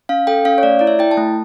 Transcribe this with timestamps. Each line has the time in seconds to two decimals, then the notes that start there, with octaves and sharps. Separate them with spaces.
0.09 C#4 F5
0.27 A4 G5
0.45 C#4 F5
0.58 C#5
0.63 A3 D5
0.79 E4 D5
0.87 E5
0.99 E4 G5
1.11 A5
1.17 A3